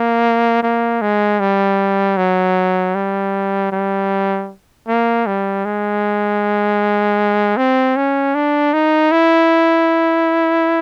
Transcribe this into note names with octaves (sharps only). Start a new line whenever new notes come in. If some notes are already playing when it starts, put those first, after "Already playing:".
Already playing: A#3
A#3
G#3
G3
F#3
G3
G3
A#3
G3
G#3
C4
C#4
D4
D#4
E4